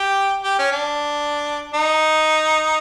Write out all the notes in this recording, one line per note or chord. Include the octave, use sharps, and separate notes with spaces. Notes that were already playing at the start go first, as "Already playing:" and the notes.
Already playing: G4
G4
C#4
D4
D#4